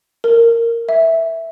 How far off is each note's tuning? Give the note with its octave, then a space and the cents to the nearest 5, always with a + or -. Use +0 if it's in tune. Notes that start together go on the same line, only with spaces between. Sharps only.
A#4 -10
E5 -5